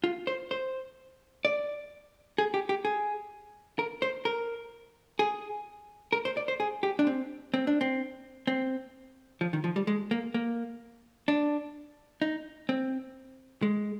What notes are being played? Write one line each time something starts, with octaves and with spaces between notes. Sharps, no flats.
F4
C5
C5
D5
G#4
G4
G4
G#4
A#4
C5
A#4
G#4
A#4
C5
D5
C5
G#4
G4
D4
C4
C4
D4
C4
C4
F3
D#3
F3
G3
G#3
A#3
A#3
D4
D#4
C4
G#3